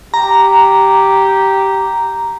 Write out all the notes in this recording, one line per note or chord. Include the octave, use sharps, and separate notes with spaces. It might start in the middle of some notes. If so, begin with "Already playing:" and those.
G4 A#5